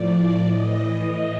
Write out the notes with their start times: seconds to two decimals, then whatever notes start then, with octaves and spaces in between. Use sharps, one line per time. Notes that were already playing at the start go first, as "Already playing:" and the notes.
Already playing: A2 F3 D5
0.44 A2 E3 D#5